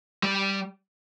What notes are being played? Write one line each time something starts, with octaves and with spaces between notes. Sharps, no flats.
G3